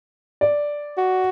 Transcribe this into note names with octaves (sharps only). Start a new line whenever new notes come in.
D5
F#4